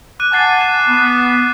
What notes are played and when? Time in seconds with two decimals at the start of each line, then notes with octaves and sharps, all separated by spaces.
0.19 D6 F#6 D#7
0.32 F#5 G#5 A5 D6 A6 C7
0.61 E7
0.88 B3